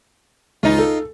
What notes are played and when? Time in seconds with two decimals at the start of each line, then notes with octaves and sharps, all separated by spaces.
0.63 C#2 D#4 F4
0.79 A4